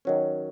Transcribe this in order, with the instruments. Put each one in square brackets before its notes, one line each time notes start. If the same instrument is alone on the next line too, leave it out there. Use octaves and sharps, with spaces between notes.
[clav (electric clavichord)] D#3 F#3 C#4